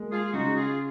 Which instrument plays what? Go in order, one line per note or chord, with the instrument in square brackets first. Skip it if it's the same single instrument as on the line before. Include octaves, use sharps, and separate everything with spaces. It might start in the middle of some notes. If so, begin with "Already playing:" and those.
Already playing: [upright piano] G#3 A#3
[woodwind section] F4 G#4
[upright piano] C#3 [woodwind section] D#4 F#4
[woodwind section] F4 G#4